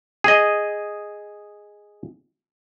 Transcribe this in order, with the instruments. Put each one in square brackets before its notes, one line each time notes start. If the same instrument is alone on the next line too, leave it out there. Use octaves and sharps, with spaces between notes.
[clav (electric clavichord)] G#4 D#5